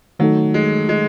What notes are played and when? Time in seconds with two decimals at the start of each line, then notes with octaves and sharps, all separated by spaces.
0.19 D#3 F#3 A3 D#4 A4
0.54 G#3
0.89 G#3